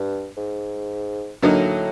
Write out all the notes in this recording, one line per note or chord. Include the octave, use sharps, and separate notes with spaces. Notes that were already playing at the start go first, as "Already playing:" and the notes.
Already playing: G2
G#2
A2 D3 F#3 A#3 D#4